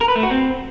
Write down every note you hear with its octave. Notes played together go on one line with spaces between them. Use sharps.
A#4
B4
A3
F#4
C4